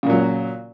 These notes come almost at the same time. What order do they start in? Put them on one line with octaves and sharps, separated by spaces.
C#3 A#2 F#3